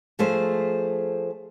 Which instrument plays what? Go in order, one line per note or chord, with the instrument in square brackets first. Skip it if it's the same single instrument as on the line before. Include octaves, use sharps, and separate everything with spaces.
[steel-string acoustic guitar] F3 A3 G#4 C5